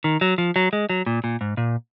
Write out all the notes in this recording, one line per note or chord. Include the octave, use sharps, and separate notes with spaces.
D#3
F#3
F3
F#3
G#3
F#3
A#2
A#2
G#2
A#2